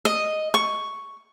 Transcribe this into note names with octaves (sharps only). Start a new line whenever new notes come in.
D#5
C#6